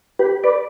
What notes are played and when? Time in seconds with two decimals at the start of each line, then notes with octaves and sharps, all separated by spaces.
0.19 G4 B4
0.44 B4 D5